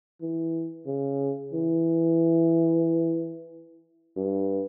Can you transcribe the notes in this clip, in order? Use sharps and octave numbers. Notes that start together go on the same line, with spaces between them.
E3
C#3
E3
G2